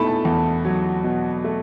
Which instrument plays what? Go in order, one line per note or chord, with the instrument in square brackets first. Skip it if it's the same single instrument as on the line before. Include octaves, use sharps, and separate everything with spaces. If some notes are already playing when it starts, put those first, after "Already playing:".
Already playing: [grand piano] B2 A3 [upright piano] A5 B5
[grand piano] E2
F#3
B2
A3